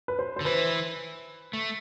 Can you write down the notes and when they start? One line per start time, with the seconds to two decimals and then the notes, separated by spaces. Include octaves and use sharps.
0.08 B4
0.19 C5
0.36 D3 C5
0.45 E3 B4
1.53 A3